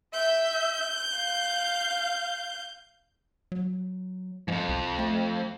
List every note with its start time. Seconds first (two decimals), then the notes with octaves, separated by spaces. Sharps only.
0.13 E5 G6
1.15 F5
3.52 F#3
4.48 F2 G#2 F3
4.69 C2
4.99 A3